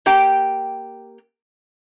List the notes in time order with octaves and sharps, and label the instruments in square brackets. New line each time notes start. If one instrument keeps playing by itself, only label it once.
[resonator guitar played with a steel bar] A#3 G4 G5